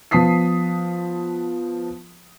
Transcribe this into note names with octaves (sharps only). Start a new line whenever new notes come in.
F3 B3 A5 D#6 B6 C7